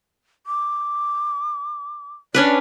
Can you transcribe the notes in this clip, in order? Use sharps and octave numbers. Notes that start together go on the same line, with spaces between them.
D6
C#4 D4 B4 D5